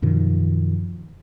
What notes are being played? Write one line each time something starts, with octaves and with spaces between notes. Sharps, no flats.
F#2 B2 D#3 F3